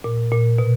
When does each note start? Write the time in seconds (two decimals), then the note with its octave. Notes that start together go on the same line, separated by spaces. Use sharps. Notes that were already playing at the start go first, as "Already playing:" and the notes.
0.04 A#2
0.32 A#2
0.58 B2